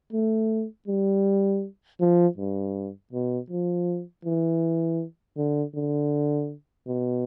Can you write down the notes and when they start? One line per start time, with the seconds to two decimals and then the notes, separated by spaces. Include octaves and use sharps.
0.13 A3
0.88 G3
2.01 F3
2.38 G2
3.13 B2
3.50 F3
4.25 E3
5.37 D3
5.75 D3
6.88 B2